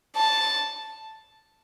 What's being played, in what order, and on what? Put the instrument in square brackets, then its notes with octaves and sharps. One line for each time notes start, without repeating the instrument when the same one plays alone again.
[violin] A5